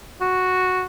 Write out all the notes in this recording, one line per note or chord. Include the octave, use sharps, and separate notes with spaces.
F#4